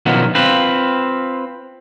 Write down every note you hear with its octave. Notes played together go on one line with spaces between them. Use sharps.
B2 D#3 F3 F#3 B3
C4 F4 B4